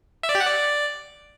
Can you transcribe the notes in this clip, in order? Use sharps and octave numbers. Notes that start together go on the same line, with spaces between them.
E5
D5
G4
F#5
D5